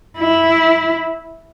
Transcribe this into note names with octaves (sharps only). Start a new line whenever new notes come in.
E4